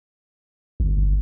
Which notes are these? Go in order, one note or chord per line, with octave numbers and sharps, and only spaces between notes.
G1